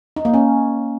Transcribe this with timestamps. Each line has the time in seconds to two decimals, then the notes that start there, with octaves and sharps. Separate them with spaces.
0.16 D#4
0.25 A#3
0.34 C#4